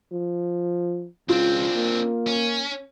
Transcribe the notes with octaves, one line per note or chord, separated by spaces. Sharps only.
F3
C#2 C4 D4 F4
A#3
C#4